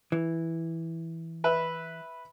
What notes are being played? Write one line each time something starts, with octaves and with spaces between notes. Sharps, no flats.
E3
B4 E5